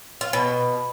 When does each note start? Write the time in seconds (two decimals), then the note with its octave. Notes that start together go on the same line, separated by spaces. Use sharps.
0.21 F4
0.33 B2